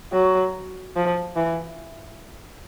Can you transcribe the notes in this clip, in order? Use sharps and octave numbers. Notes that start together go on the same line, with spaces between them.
F#3
F3
E3